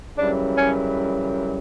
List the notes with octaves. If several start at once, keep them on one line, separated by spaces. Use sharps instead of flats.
F#2 C#3 E3 G3 D4
C#4